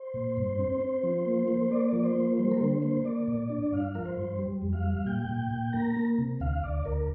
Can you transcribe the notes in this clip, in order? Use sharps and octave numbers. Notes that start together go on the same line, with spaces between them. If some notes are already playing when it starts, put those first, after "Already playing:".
Already playing: C5
A#2
G2
C4
C4
F3
A#3
A#3
A#3 D5
F3
C5
A#3
G3 C5
A#4
D3 C5
A#3 C5
A#3 D5
A#2
D4
G2 F5
F3 A#4
C5
G2
G3
F2
F5
G3
A#2 G5
A#2
A#2
A#3 A#5
A#3
C3
D2 F5
D2 D5
D2 A#4